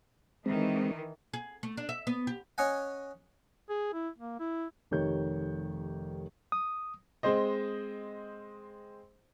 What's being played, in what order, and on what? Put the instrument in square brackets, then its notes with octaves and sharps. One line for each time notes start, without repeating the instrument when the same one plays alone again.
[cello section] D#3 E3 [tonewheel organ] G#3 C4
[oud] G#4
A3
D4
E5
B3
G4
[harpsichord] C#4 C#5 D#5 F#5 G#5
[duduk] G#4
E4
A#3
E4
[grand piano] F1 D#3 G4 C#5 G6
[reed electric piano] D#6
[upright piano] G#3 C4 C5 D#5